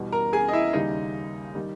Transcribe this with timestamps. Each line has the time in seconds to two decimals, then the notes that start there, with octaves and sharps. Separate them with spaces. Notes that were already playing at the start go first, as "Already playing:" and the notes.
Already playing: E2 B2 G3
0.12 A#4 A#5
0.33 G#4 G#5
0.49 D#5
0.53 E4 E5
0.73 D#2 C#3 G3 D#4 D#5
1.55 D#3 G3